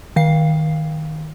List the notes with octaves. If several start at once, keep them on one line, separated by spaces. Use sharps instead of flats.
D#3 F5 C7